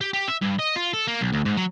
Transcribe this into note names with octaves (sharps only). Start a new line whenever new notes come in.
G4
G4
E5
G2
D#5
F4
A4
A#3
B1
D2
G#2
F#3